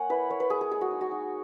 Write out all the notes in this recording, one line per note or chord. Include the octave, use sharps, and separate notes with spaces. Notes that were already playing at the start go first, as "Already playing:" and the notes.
Already playing: A#3 C#5 F#5 G#5
E4 B4
A#3 C#5
B4
A#3 G#4
G#4
G#3 G#4
F#4
D#4
F#4
D#4